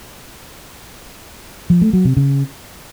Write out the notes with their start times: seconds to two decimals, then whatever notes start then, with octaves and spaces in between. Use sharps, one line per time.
1.70 F3
1.82 A3
1.93 F#3
2.05 C3
2.17 C#3